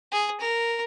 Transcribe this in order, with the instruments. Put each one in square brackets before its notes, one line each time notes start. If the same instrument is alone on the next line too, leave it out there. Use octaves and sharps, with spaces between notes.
[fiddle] G#4
A#4